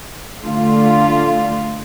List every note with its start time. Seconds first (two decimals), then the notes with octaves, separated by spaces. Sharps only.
0.44 D3 A3 F4